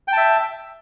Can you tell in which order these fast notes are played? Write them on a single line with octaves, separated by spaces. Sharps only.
G5 A5 E5